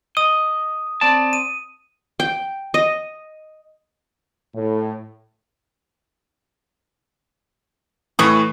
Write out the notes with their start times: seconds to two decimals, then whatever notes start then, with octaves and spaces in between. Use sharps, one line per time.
0.17 D#5 D#6
1.01 C4 D5 A5
1.33 D#7
2.20 G5
2.74 D#5
4.55 A2
8.19 A2 E3 C#6 D#6